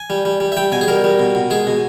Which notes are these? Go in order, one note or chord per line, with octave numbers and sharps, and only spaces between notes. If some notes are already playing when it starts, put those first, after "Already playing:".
Already playing: G#5
G3
G3
G3
E5
G3 G5
B2 G#5
G#4
G3 A#4
G3
B2
B2
G#3 G#4
B2